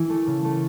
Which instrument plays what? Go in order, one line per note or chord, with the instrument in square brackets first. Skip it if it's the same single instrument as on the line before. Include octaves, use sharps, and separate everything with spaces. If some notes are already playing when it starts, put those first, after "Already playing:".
Already playing: [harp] E3 E4
A3
C#3
A3